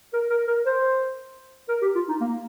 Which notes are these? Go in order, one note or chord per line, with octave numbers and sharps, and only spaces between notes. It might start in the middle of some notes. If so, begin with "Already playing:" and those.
A#4
A#4
A#4
C5
A#4
G4
F4
D#4
A#3